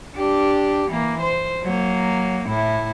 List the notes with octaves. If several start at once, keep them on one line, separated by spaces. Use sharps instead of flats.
D4 G4
E3 A#3
C5
F#3 A#3
A2 E4